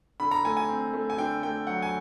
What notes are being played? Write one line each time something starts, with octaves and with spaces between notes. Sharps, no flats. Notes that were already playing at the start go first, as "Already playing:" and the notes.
D3 B5
A#5
A3 G#5
G#5
C4
A3
G#5
D3 G5
A3 G5
F#3 F#5
G#5